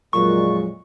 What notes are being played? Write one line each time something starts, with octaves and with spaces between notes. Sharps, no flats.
F2 A#2 F#3 G#3 C#6